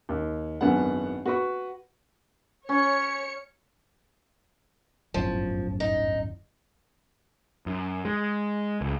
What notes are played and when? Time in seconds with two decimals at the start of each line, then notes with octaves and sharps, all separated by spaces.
0.09 D#2
0.61 G#1 F#2 B3 D4 F#5
1.26 F#4 B4 C#6
2.69 C#4 C#5 C#7
5.14 D1 G1 F#2 F3
5.80 D#4
7.66 F#2
8.05 G#3
8.81 C#2